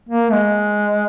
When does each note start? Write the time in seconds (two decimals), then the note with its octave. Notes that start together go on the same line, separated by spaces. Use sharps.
0.09 A#3
0.32 G#3